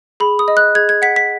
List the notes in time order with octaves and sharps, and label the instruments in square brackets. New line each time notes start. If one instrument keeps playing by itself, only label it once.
[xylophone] G#4 B5
D#6
D#5
F#6
G#4 G#6
G#6
F#5 B6
B6